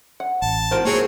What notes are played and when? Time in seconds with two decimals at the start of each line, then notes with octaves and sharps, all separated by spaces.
0.20 F#5
0.42 A1 A5
0.71 E2 C3 F4 F#4 A#4 C5
0.85 D#3 F#3 A#3 C4 G#4 C#5